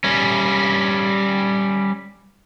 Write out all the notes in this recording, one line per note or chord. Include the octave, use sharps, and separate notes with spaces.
G3 C#4